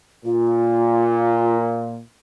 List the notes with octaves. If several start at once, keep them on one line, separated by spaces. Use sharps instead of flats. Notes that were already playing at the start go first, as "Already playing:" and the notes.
A#2 F4